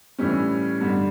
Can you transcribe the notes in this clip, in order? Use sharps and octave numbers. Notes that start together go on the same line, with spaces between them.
A2 E3 G3 C#4
G2 D3 G3